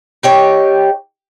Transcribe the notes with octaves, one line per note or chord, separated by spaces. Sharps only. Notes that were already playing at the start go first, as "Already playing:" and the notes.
D#4 G4 C#5